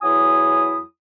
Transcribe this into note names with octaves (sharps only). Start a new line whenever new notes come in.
E2 F#3 E4 G#5 D#6